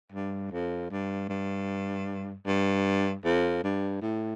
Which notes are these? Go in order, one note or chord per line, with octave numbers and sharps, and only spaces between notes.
G2
F2
G2
G2
G2
F2
G2
A2